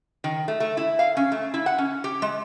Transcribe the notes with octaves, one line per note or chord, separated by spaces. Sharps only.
D#3
A3
A3
E4
F5
C#4
A3
E4
F#5
C#4
G4
G#3